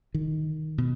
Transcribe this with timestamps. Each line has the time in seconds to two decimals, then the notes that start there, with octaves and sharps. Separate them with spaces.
0.14 D#3
0.78 B2